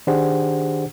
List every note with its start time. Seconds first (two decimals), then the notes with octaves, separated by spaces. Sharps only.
0.07 D#3 D4 G4 G#4 C5 F#5